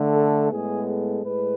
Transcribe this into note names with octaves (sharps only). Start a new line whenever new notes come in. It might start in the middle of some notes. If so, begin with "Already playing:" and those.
Already playing: D3 A3
A4
A2 G#3 B3 G#4
A4
A2 G#3 B4